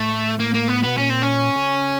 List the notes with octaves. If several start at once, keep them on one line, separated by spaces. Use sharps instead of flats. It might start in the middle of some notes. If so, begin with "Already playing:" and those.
Already playing: A2 A3
A#3
A#3
B3
B2 B3
A#2 C#4
C4
C#4
C#3